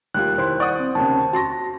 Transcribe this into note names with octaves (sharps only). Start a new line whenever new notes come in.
D#2 G3 F4 F#6
D#2 E4 C5 C6
D5 F#5 C#6 D#6
C4
D#2 C#3 A5
F#4 A5 C6 C#6 A#6